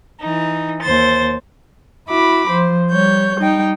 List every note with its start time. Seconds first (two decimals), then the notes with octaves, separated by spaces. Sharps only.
0.21 E3 D#4
0.81 D#2 C5 A6
2.08 E4 F#4 B5 D6
2.49 F3 C5
2.90 G3 C#5 G6
3.37 G3 D#4 G5